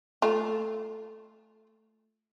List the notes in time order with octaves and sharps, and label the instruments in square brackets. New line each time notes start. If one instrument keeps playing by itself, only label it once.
[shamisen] A3 F4